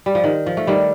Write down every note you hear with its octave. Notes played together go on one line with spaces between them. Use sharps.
G3
F3
D#3
F3
A3
D#3 G3